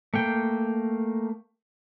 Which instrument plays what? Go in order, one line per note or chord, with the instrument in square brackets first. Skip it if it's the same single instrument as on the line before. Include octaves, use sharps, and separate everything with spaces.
[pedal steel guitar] A3 A#3 G5